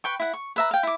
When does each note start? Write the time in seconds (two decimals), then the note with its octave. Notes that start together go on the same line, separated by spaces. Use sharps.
0.04 B4 G5 C#6
0.19 E4 F#5
0.33 C#6
0.56 B4 E5 A#5
0.71 F5 G5
0.83 E4 D6